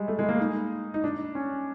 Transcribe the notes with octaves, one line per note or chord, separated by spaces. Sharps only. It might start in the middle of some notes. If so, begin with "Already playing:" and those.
Already playing: G3 G#3
A3
G#3
A#3
D#4
D#4
D4
C#4